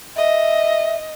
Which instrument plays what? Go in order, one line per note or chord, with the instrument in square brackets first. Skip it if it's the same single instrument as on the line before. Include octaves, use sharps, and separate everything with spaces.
[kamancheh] D#5 [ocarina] E5